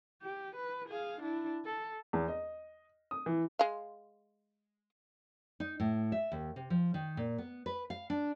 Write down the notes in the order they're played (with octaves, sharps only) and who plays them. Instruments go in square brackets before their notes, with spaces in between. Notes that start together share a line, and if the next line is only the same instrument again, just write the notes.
[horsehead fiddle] G4
B4
G#4 F5
D4 E4
A4
[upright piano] E2
D#5
D#6
E3
[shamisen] G#3 F5
[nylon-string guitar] D#4
A2
E5
D#2
C3
F3
D#3
A#2
B3
B4
F5
D4